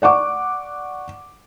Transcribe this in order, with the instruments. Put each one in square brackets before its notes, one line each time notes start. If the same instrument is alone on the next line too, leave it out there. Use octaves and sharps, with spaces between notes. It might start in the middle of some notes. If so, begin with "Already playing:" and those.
[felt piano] D5 F#5 C#6 D6